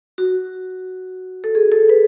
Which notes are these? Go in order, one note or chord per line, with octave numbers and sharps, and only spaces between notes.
F#4
A4
G#4
A4
B4